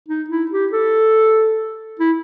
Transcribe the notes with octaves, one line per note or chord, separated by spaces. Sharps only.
D#4
E4
G4
A4
E4